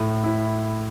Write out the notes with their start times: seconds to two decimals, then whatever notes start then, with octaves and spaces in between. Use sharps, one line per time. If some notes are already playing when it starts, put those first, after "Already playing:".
Already playing: A2
0.24 E4